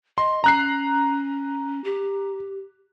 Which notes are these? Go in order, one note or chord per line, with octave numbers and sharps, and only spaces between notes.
D#5 C6
C#4 A#5 F#6 C7
G4